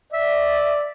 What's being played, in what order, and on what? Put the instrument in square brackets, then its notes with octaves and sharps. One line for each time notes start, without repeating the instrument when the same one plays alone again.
[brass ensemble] D5 [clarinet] E5